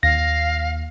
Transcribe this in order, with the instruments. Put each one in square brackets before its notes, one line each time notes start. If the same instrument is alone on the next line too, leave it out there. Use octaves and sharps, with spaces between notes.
[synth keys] D#2 [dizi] F5 [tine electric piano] A#6